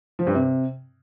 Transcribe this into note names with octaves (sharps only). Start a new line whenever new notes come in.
F3
G2
C3